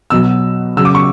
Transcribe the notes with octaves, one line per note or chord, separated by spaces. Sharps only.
B2 F#3 E6
C#3 F#3 E6
D6
C#6